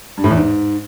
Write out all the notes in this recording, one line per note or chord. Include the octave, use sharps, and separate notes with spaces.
G2
A2
E2
G#2